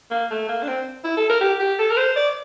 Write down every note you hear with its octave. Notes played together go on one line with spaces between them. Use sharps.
A#3
A3
A#3
D4
C4
E4
A4
A#4
G4
G4
A4
A#4
C5
D5